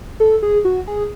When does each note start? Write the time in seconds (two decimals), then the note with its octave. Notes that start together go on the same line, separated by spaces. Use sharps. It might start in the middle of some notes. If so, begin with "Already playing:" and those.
0.20 A4
0.43 G#4
0.65 F#4
0.87 G#4